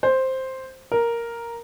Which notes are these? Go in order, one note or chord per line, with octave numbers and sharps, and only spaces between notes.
C5
A#4